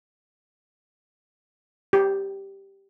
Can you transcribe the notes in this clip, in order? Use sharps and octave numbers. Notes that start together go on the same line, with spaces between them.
G4